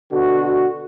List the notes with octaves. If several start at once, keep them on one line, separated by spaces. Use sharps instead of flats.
B2 D3 F#4